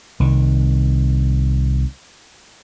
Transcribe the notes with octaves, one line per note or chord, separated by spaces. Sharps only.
C2 D#3